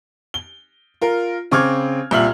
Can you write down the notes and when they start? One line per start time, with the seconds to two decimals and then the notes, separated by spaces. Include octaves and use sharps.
0.34 G7
1.01 F4 A#4
1.51 C#3 C4 C#6 D6 F6 G#6
2.11 C2 A#2 E5 F6 F#7